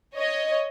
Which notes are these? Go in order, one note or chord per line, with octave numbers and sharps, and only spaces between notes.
C#5 D#5